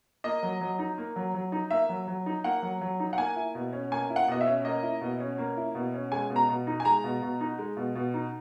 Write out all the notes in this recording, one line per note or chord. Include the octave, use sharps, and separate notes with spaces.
A#3 D#5
F#3
F#3
D#4
A#3
F#3
F#3
D#4
A#3 E5
F#3
F#3
D#4
A#3 F#5
F#3
F#3
D#4
F#5
A#3 G#5
E4
B2
C#4
A#3 G#5
E4
F#5
B2 D#5
E5
C#4
A#3 D#5
E4
B2
C#4
A#3
E4
B2
C#4
G#3 G#5
B2
A#5
B2
D#4
G#5
G#3 A#5
B2
B2
D#4
G#3
B2
B2
D#4